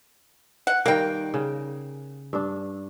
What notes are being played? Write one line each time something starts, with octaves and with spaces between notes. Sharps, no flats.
F#5
D#3 G3 A#3 A#4 G5
C#3
G2 D4